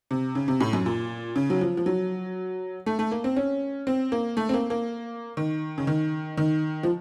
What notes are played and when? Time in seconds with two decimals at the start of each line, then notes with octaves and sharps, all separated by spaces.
0.11 C3
0.35 C#3
0.48 C3
0.60 A2
0.73 F#2
0.86 A#2
1.36 C#3
1.50 F#3
1.61 F3
1.77 F3
1.86 F#3
2.86 A3
2.99 A3
3.11 A#3
3.24 C4
3.37 C#4
3.87 C4
4.12 A#3
4.37 A3
4.49 C4
4.54 A#3
4.70 A#3
5.37 D#3
5.78 C#3
5.87 D#3
6.37 D#3
6.83 F3